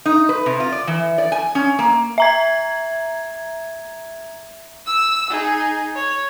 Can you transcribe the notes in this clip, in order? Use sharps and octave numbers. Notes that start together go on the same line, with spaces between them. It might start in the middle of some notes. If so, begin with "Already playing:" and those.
D#4
B4
C3
F4
D5
E3
D5
G#5
C#4
A#3
E5 A#5 G#6
E6
D#4 G#4
C#5